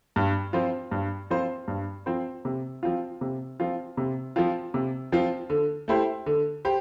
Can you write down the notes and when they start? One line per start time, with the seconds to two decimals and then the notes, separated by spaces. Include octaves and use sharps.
0.16 G2
0.53 F3 C4 F4 C5
0.91 G2
1.30 F3 C4 F4 C5
1.68 G2
2.06 F3 C4 F4 C5
2.45 C3
2.83 F3 C4 F4
3.21 C3
3.60 F3 C4 F4
3.97 C3
4.36 F3 C4 F4
4.74 C3
5.12 F3 C4 F4
5.50 D3
5.88 A3 E4 G4 C5
6.26 D3
6.65 G4 C5